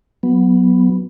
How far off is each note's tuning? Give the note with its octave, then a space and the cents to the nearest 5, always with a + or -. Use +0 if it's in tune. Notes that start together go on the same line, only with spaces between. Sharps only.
F#3 -5 B3 +0